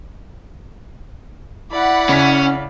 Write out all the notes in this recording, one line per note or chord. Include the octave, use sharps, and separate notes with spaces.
E4 D5 F#5 B5
C#3 C#4 B6